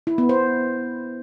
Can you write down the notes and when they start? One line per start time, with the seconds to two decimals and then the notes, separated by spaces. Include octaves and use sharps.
0.07 E4
0.18 B3
0.29 C5